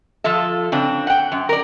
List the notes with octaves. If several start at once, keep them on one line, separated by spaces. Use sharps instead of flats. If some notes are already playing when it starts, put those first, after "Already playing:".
F3 F4 A4 E5
C#3 C4 D4
F#5 G5
F#2
A#4 D5